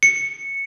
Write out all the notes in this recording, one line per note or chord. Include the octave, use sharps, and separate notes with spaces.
C#7